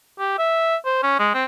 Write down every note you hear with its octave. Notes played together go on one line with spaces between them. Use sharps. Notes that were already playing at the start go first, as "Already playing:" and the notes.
G4
E5
C5
C#4
G#3
C4